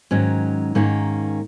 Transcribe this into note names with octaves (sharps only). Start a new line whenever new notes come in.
G#2 D#3 F#3 C#4
G#2 D#3 A#3 C#4